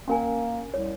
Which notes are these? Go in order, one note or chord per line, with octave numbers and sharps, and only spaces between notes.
A#3 C#4 A#4 G#5
C2 C#5